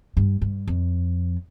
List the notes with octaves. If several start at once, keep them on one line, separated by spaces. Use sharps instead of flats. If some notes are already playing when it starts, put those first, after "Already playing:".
G2
G2
F2